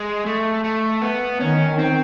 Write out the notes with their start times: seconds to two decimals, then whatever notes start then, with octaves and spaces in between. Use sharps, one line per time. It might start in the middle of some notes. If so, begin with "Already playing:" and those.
Already playing: G#3
0.26 A3
0.64 A3
1.02 B3
1.40 D#3 C#4
1.79 C4